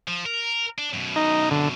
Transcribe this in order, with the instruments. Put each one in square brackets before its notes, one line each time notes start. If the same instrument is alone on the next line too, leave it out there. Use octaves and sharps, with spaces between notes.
[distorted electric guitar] F3
A#4
D4
F#2 B2
[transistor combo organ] D#4
D3